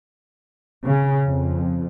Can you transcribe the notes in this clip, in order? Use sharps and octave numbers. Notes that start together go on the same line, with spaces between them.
C#3
F2